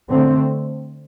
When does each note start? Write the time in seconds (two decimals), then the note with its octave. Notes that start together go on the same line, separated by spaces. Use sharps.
0.09 D3 A3 C4